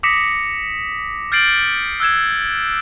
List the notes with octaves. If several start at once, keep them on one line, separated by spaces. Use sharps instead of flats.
D6 D#6 A#6 B6 C#7 E7
F6 G6 A6 C7 D7 F#7
E6 F#6 G#6 E7